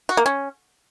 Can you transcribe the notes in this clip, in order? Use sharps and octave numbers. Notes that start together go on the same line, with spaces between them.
F#4
A#3
C#4